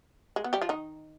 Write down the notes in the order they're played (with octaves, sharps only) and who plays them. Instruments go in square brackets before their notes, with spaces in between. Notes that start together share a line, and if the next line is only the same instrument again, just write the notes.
[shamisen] G#3
B3
G3 G4
F3 F4
D#3 D#4